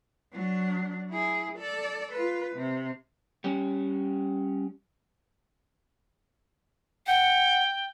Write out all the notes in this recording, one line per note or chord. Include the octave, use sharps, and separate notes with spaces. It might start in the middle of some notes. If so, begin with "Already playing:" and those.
F#3 D4
E4 G#4
A4 D5
F4 B4
C3
G3 C#4
F#5 G5